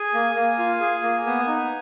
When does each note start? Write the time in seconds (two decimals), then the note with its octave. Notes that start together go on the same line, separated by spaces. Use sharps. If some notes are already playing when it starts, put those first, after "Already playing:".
Already playing: G#4 G#5
0.14 A#3
0.36 A#3
0.59 F4
0.81 G#4
1.03 A#3
1.26 B3
1.48 D#4